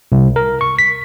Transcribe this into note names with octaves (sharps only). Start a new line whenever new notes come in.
C2
A#4
C#6
B6